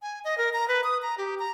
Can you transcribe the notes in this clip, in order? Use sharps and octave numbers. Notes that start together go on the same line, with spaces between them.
G#5
D#5
A#4
A#5
B4
D#6
A#5
G4
A#5